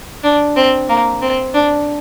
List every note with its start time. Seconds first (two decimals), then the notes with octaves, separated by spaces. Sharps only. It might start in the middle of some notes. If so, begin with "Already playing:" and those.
0.24 D4
0.56 C4
0.89 A#3
1.22 C4
1.54 D4